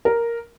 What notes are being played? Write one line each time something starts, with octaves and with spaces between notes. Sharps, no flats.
A#4